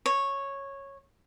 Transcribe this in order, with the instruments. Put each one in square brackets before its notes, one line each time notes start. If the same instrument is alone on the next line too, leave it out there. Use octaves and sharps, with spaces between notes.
[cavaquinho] C#5